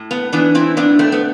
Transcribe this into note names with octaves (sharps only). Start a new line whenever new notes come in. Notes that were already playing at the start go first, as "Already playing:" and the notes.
Already playing: A2
B3
E3 B3 D4
C4 E4
A2 B3 D4
A3 C4
B3